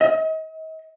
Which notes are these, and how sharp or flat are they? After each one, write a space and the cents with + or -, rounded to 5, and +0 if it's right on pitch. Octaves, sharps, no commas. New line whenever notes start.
D#5 +40